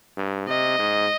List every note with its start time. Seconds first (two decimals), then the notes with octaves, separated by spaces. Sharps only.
0.17 G2
0.48 C3 D#5
0.79 G#2